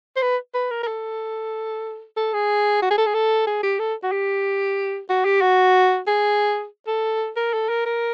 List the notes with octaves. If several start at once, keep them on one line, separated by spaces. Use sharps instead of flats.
C5
B4
B4
A#4
A#4
A4
A4
G#4
F#4
G#4
A4
G#4
A4
G#4
G4
A4
F#4
G4
F#4
G4
F#4
G#4
A4
A#4
A4
A#4
A#4